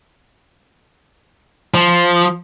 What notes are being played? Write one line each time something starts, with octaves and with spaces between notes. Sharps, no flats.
F3